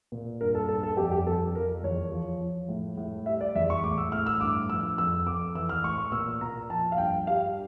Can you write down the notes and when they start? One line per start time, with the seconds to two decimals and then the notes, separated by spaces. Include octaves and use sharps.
0.12 A#2
0.41 G2 A#4
0.55 A4
0.69 G2 A4
0.83 A4
0.97 F2 G4
1.11 G4
1.26 F2 A4
1.55 F3 A#4
1.83 E2 C#5
2.12 F3
2.41 F3
2.69 A2
2.97 A2
3.26 G3 E5
3.41 D5
3.55 E2 E5
3.70 C#6
3.84 A2 D6
3.98 E6
4.12 A2 F6
4.27 E6
4.41 G2 D6
4.69 F3 E6
4.98 F2 E6
5.26 F2 D6
5.55 E3 E6
5.69 F6
5.83 A2 C#6
5.98 C#6
6.12 A#2 E6
6.41 A#2 A#5
6.70 F3 A5
6.92 F5
6.98 G2 G5
7.27 G3 F5